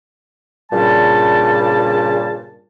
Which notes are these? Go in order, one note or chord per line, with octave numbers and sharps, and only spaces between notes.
G2 A#2 C#3 G3 A5